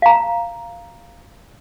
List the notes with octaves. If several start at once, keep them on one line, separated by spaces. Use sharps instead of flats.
F5 A#5